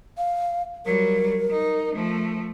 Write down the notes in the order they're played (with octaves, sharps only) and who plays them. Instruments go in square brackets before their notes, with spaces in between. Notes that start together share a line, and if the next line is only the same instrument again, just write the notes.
[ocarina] F5
[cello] F#3 G3 [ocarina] A#4
[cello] D#4
F3 A3